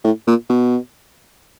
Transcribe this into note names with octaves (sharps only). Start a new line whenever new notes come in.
A2
A#2
B2